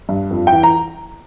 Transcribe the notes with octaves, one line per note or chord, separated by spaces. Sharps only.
G2
F2
G5
E3
A#5